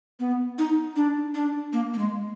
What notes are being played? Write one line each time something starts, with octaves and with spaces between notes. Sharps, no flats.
B3
D#4
D4
D4
A#3
A#3
G#3